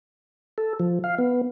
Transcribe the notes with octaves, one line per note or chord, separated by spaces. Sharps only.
A4
F3
F5
B3